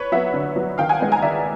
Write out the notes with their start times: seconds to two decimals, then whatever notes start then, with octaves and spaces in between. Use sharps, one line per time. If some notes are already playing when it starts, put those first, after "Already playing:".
Already playing: B4 C#5
0.12 F#3 B3 E5 F#5
0.34 D3
0.56 F#3 B3
0.78 D#3 F5 G5
0.89 F#5 G#5
1.00 G#3 B3
1.12 G#5 A#5
1.22 D#3 D5 E5